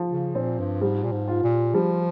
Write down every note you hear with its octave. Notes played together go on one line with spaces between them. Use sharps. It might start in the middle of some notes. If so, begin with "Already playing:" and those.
Already playing: F3
C#3
A#2 C4
G2
G#2 G3
A#2
G#2
F4
A#2
F3 G3